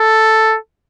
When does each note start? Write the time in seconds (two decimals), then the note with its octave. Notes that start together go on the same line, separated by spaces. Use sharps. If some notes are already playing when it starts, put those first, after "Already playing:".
Already playing: A4